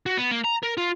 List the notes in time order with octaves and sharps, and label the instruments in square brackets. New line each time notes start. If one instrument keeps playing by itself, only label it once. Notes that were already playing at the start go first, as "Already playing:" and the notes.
[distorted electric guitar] F#4
B3
A#3
A#5
A#4
F4